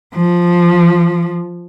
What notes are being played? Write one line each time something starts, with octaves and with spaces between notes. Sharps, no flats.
F3